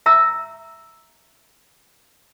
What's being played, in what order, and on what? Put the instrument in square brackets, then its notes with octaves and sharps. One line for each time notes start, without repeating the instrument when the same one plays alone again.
[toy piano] E5 A#5 E6